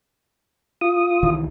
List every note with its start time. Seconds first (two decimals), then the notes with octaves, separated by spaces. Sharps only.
0.81 F4 D#6
1.23 C2 D#3 E3